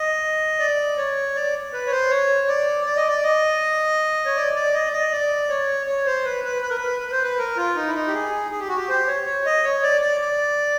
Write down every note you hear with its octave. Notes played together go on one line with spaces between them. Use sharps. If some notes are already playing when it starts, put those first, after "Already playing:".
Already playing: D#5
D5
C#5
D5
B4
C#5
C5
C#5
D5
D5
D#5
D5
D#5
C#5
D5
D5
D#5
D5
D#5
D5
C#5
C#5
C5
B4
B4
B4
A#4
B4
B4
C5
B4
A#4
F4
D#4
E4
D#4
G4
G#4
G#4
G4
F#4
G4
C5
C#5
C#5
D#5
C#5
D5
D5
D5